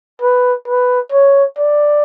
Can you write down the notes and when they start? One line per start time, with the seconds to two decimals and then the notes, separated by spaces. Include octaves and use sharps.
0.22 B4
0.68 B4
1.12 C#5
1.58 D5